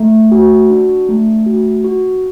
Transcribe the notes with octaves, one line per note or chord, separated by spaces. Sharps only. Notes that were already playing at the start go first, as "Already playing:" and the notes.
Already playing: A3
F#4
D4
A3
F#4
F#4